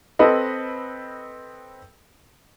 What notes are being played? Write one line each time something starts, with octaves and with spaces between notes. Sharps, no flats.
C4 A4 B4 D#5